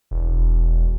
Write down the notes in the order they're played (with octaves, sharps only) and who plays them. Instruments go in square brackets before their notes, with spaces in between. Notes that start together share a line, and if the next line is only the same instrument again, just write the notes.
[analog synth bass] E1